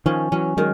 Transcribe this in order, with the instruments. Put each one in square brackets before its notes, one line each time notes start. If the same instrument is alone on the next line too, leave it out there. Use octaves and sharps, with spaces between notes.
[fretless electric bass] D#3 F3 [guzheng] C#4
[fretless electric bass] E3 F#3 [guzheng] C#4
[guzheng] D#3 [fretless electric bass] F#3 G#3